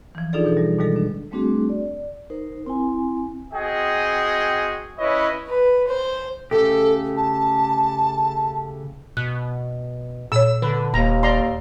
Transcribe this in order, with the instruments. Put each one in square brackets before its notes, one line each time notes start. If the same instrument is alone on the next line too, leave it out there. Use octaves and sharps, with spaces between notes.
[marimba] E3 F3
D4 D#4 F4 G#4 A4 D5
B2 E3 A4
G3
B2 D#3 G3 G#3 A4
D4
[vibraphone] G3 A3 C4 D4 F#4 G#4
D5
D#4 A#4 C5
C4 E4 G#5
[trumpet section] C4 F#4 G#4 D#5 G5
C#4 E4 B4 C#5 D#5
[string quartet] B4
C5
[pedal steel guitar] C#3 A3 G4 [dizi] A4
[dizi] A5
[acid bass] B2 [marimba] F#6
[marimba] A#2 C#5 [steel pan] E6
[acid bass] D3 [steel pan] B4
[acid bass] D#1 [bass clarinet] D#2 [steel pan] A#5
[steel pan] D5 A#5 C6